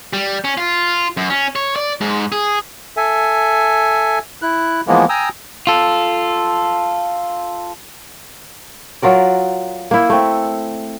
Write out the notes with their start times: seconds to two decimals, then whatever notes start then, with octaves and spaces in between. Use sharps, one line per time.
0.13 G3
0.44 C#4
0.57 F4
1.17 F#2
1.30 C#4
1.56 C#5
1.76 D5
2.01 G#2
2.32 G#4
2.97 A4 E5 G#5
4.42 E4 F#6
4.87 E3 F3 G#3 A#3 B3
5.09 G5 G#5 A#5 D#6 E6
5.67 F4 A4
9.02 F#3 F4 A#4 D5
9.91 A#3 E4
10.10 A3 C4